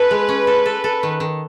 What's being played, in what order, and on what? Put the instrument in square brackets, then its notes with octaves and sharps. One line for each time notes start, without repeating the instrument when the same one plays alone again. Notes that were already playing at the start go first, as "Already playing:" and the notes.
Already playing: [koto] C#4 A4 [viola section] B4
[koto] G#3
C#4
A4
A4
A4
D#3
D#3